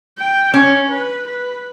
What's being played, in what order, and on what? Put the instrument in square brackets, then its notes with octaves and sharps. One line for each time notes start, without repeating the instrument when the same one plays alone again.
[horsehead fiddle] G5
[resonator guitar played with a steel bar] C#4 [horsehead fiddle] C#5
[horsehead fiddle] B4
B4